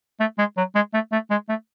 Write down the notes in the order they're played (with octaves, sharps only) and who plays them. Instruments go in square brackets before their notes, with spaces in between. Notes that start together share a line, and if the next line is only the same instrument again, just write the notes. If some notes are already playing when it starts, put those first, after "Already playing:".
[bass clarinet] A3
G#3
F#3
G#3
A3
A3
G#3
A3